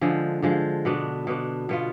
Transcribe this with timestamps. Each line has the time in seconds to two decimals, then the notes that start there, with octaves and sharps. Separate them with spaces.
0.01 D3 F3 G#3
0.42 D3 F3 G#3
0.85 B2 B3 D4
1.27 B2 B3 D4
1.69 B2 B3 F4